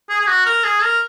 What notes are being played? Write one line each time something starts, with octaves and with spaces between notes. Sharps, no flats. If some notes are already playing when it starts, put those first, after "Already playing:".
G#4
G#4
F#4
A#4
G#4
A#4